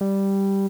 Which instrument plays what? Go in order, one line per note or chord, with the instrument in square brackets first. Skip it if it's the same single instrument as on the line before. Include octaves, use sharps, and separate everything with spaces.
[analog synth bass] G3